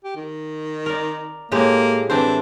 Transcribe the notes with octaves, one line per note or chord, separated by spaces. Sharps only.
G4
D#3
A#4 D5
A2 G#3 A#3 G4
E3 C4 D4 C5